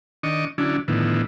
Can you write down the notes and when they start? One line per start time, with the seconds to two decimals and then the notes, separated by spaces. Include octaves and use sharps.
0.23 D#3 D4 D#5 C#6
0.58 D3 F#3 C#4 D4 E4
0.88 A2 D3 D#3 F3 B3 E4